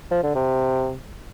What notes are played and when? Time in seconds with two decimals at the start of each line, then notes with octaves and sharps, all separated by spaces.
0.11 F3
0.23 D3
0.35 C3